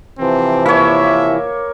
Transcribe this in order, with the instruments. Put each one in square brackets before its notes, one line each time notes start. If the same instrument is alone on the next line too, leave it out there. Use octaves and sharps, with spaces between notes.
[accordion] C3 E3 F3 [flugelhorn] C4
[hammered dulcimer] A#3 C#5 [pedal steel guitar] E4 [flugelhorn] E5